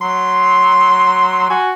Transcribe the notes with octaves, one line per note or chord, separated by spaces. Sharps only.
F#3 C6
F#4 G#5